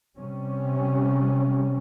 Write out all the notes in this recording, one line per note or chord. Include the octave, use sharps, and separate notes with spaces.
C3 G3 C#4